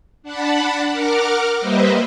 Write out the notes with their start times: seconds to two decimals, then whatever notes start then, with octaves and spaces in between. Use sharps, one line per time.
0.23 D4 F#5 A5 B5
0.89 A#4 F#5 D6 F6
1.58 G3 A#3 B4 C5 D#5 E5